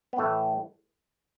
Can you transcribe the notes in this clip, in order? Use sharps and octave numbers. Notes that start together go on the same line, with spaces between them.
B3
A2 E3 A3